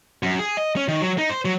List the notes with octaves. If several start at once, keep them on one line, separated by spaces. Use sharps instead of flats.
F#2
G#4
D#5
C#4
D#3
F#3
D#4
C5
F#3